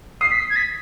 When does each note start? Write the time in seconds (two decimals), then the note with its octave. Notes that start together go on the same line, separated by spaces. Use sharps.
0.21 D#6 C7
0.31 B6
0.39 C7
0.50 G#6
0.56 B6